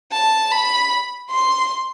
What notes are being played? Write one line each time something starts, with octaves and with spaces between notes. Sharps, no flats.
A5
B5
C6